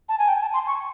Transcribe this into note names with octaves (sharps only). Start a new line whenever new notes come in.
A5
G#5
G5
A5
C6
C#6